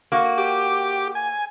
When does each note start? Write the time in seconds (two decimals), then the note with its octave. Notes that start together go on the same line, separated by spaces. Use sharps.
0.12 A#3 F#4
0.38 G4 D6
1.15 G#5